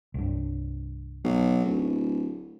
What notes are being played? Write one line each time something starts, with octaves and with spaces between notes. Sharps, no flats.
C2 G2
B1
D1